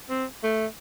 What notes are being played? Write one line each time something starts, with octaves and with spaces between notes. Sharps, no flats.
C4
A3